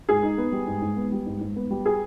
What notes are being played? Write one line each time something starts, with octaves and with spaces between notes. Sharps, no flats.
G#2 G#4
D#4
B3
G3
G#2
G#2
B3
G3
G#2
G#2
B3
G3
G#4